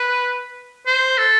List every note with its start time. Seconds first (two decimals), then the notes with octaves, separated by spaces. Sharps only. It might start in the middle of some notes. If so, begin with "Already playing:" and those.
Already playing: B4
0.86 C5
1.18 A4